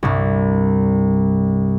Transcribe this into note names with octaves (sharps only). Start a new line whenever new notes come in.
C2 G2